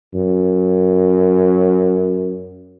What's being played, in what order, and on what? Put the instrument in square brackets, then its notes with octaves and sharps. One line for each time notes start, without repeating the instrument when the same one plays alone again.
[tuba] F#2